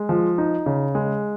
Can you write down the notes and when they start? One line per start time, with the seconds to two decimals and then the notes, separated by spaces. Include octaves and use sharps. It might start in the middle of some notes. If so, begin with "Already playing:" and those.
Already playing: G#3
0.09 F3
0.38 D#4
0.66 C#3
0.95 G#3